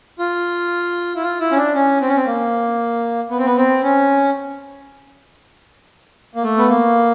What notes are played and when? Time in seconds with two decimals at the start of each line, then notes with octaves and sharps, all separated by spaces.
0.19 F4
1.16 E4
1.23 F4
1.41 E4
1.52 C#4
1.57 D4
1.75 C#4
2.01 C4
2.09 C#4
2.16 C4
2.27 A#3
3.30 B3
3.39 C4
3.45 B3
3.58 C4
3.83 C#4
6.35 A#3
6.44 A3
6.58 B3
6.69 A#3